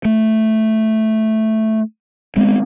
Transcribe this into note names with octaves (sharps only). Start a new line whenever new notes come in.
A3
G#3 B3 C4